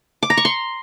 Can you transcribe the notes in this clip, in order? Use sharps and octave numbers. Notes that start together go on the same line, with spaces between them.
D6
A#5
C#6
C6